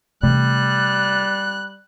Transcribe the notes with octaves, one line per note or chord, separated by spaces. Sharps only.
C3 E3 G3 A3 F#6